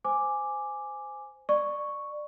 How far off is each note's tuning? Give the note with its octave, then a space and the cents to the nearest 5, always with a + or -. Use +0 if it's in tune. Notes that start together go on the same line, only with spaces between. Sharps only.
C5 -15 G#5 +0 D6 +0
D5 +20 C#6 +0